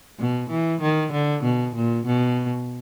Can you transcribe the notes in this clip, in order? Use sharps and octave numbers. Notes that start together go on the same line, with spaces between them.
B2
E3
D#3
D3
B2
A#2
B2